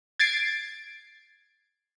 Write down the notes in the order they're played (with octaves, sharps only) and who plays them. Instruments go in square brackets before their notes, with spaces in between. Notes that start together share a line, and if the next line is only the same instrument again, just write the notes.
[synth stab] G#6 A6 C7 D7